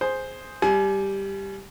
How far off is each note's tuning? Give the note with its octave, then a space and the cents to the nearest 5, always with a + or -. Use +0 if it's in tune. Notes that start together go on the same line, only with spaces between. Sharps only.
G#4 +0 C5 +0
G3 +0 G#5 +30